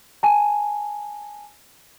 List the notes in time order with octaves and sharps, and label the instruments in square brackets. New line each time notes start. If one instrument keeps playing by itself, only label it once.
[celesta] G#5 A5